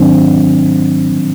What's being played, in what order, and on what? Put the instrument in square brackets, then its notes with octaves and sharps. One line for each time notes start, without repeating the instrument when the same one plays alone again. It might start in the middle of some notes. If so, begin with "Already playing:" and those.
Already playing: [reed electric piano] G#2 D#3 F#3 C4 D4